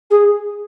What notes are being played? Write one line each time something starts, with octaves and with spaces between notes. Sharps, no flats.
G#4